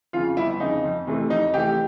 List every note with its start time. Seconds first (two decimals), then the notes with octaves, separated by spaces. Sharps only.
0.13 F2 C#3 F4
0.37 G1 E4
0.60 F2 C#3 D#4
0.84 F2
1.07 C3 E3 A3
1.29 F2 D#4
1.54 C3 E3 A3 G4